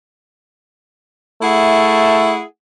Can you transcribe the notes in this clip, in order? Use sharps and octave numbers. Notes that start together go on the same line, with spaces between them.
A3 E4 G#4 F#5